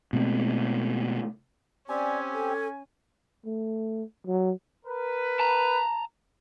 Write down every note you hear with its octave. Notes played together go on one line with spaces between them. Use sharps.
B2 G#3 A3 C4
C4 C#4 G4 D5 G#5
A4
A3
F#3
A#4 B4
A5 A#5